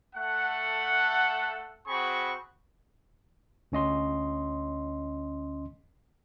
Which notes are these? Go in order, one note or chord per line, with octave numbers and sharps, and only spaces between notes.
A3 A4 F#5
C4 F#4 G#4 B5 C#6
D2 C#4 D#5 C6